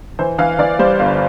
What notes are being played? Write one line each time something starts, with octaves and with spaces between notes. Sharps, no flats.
E3 C5
E3 F5
E3 D5
G3 C5
G1 F5